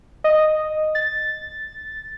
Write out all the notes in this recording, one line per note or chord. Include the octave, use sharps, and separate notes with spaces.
D#5
A6